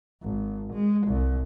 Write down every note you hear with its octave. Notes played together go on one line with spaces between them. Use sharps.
G#1
G#3
C2